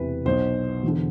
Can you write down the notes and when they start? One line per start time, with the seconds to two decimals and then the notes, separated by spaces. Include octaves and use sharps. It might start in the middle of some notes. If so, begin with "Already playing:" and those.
Already playing: E1 E2 C3 E3 B4
0.25 B1 B2 C5
0.83 E1 E2 D3